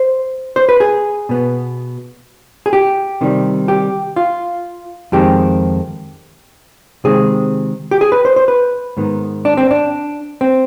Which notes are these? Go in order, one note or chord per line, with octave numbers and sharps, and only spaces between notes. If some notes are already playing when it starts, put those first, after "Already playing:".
Already playing: C5
C5
B4
G#4
B2 B3
G#4
G4
C3 D#3 G3
G4
F4
F2 D#3 G#3 C4 G4
C3 D#3 G#3 C4 G#4
G4
G#4
B4
C5
C5
B4
G#2 D#3 B3
D4
C4
D4
C4